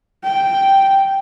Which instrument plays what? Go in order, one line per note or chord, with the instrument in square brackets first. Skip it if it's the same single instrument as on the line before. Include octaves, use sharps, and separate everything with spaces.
[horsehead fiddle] G5